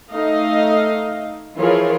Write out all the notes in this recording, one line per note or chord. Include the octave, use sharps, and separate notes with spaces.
A3 D#4 D#5 F5
E3 F3 F4 G#4 A#4 C#5